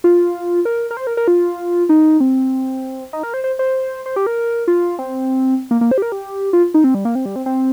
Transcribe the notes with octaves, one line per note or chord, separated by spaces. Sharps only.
F4
A#4
A#4
C5
A#4
A#4
F4
D#4
C4
D#4
A#4
C5
C5
C5
C5
G4
A#4
F4
C4
A#3
A#3
C5
G4
A#4
G4
F4
D#4
C4
G3
A#3
C4
G3
C4
C4